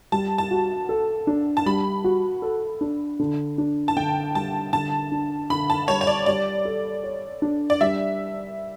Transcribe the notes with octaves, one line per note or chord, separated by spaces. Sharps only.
G3 A5
A5
F#4
A4
D4
A5
G3 B5
F#4
A4
D4
D3
D4
A5
D3 G5
G3 A5
D3 A5
D4
D3 B5
A5
G3 C#5
C#5
D5
G3 D5
A4
C#5
D4
D5
G3 E5